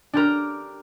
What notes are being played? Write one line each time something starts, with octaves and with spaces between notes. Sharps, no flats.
D4 G4 A#4